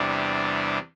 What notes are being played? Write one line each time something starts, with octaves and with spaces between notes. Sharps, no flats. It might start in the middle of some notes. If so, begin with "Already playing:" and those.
Already playing: E2 C3 G3 D4